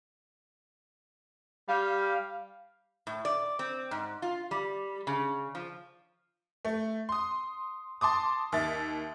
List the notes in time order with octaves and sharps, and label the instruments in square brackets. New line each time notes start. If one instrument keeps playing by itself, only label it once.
[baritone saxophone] G3 [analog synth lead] F5
[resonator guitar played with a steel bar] A2
D5
C4
G#2
F4
G3
C#3
F3
[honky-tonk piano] A3
C6 D#6
A5 C6 D6 D#6
D#2 E5 A6